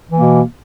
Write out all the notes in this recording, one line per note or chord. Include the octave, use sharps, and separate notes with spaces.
B2 E3 A#3